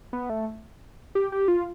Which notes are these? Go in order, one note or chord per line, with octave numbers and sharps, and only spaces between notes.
B3
A3
G4
G4
F4